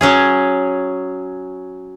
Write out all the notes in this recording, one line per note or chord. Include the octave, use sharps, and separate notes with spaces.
F#3 C#4 G#4